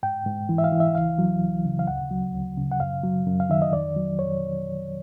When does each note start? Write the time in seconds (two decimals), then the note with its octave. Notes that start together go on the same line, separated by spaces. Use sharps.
0.03 G#2 G5
0.26 G#2
0.49 E3
0.58 E5
0.64 F5
0.72 E3
0.80 E5
0.95 C#2 F5
1.19 F#3
1.42 C#2
1.65 C#3
1.79 F5
1.87 D2 F#5
2.11 F#3
2.34 D2
2.57 C#3
2.72 F#5
2.80 F#2 F5
3.04 F#3
3.27 F#2
3.40 F5
3.50 D#3 E5
3.62 D#5
3.73 F2 D5
3.96 F#3
4.19 F2 C#5